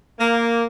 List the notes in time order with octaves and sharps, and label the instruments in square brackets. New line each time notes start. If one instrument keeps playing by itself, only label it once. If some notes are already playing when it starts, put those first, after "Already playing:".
[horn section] A#3